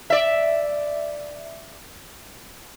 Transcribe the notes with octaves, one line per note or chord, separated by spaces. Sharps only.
D5 E5